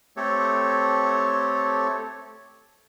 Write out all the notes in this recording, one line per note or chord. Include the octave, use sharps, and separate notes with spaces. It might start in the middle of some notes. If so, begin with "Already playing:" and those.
A3 C4 G4 A4 C#5